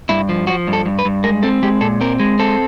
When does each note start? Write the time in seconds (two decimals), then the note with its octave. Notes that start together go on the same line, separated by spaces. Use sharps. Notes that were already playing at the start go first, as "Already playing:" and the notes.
0.09 G2 E4
0.29 F3
0.47 F3 F#4
0.67 G2
0.73 A4
0.86 G2
0.99 B4
1.05 G2
1.24 G#3 A#4
1.43 C4 A4
1.63 G#3 G4
1.81 A#2 A4
2.01 C4 A#4
2.19 G#3
2.39 C4 A4